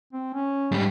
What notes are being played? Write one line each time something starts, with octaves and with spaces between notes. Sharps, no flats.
C4
C#4
G#2 G3